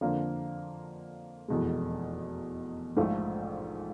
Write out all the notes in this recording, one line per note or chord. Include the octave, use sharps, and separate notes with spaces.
F2 D3 F3 A#3 D4
F1 E2 B2 G#3
A#1 G#2 F3 A3